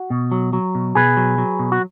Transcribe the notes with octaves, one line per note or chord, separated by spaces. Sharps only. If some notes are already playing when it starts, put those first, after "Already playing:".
Already playing: F#4
B2
F#3
F#3
B2
B2 G#4 B4
F#3
F#3
B2
F#4